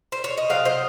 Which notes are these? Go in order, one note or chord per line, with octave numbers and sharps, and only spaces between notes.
C5
C#5
D#5
C3 F#3 C4 F5
C5 D#5